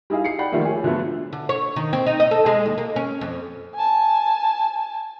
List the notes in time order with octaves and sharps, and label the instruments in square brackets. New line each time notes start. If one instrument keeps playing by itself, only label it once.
[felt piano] G3 D#4 E4 G#4 F5
C7 C#7
D5 F#5 G5 B5
D#3 F3 G3 A3 A#3
G#4 C#5
D3 F3 F#3 A3 B3
[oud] D3
C#5
D#3
C4
D#4
D#5
A4
G#3
D#2
A#3
C#4
F2
[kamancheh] G#5 A5